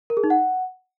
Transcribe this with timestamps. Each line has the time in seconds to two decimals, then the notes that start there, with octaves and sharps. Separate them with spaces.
0.10 A#4
0.17 G#4
0.24 D#4
0.30 F#5